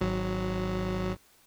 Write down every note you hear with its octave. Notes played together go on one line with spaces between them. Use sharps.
G#1 F#3